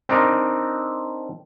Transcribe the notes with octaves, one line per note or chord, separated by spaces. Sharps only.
C4 D4 D#4 A#4